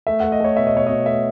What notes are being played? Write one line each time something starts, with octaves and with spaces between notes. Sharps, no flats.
A3 E5
A3 F#5
D#5
A3 C#5
B2 E5
D#5
B2 C#5
B2 D#5
A3 E5